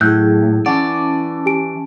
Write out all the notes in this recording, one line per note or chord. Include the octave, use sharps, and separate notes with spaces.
A2 F#3 E4 G#4 E6 F#6 G6
E3 C#4 D5 F#5 A5
G4 G#5 D7